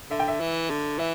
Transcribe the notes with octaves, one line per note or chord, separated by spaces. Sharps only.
D3 E5
G5
E5
E3
D3
E3 E5